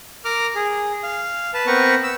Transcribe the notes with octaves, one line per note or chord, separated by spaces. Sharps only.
A#4 D6 F6
G#4
F5
B4 A5
B3 C4 A#4 B4 C#6
E6